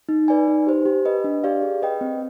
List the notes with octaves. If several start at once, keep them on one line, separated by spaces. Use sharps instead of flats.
D#4
B4 D5 G#5
D#4
G4 C5
G4
B4 D#5
D4
G4 D5 F5
G#4
B4 D#5 G5
C4